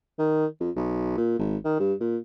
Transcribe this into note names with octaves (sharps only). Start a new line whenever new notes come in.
D#3
F2
B1
A#2
G#1
D#3
G2
A#2